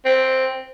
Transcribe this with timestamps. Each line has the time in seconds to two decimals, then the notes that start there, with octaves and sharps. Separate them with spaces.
0.05 C4